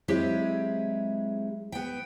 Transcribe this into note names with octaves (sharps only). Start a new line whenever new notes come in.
F#3 G#3 C4 E4 G4 G#4
B3 G5